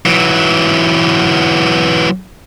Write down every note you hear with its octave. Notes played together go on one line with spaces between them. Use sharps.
E3 F#3